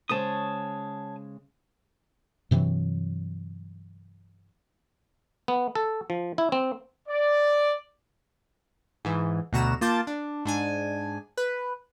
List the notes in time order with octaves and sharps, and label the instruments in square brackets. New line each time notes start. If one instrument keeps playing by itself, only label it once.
[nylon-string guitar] C#3 G#3 C5 [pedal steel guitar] C#5 A5 D#6
[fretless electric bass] G2 C3 E3 F#3
[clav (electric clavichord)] B3
A4
F3
E4
C4
[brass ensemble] D5
[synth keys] G#2 E3
D2 B2 F#4 A#5 E7
A#3 F4 A5 D6 G6
D4
G#2 D4 G#5
B4